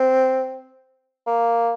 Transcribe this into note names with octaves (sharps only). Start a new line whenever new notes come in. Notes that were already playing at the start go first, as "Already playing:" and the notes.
Already playing: C4
A#3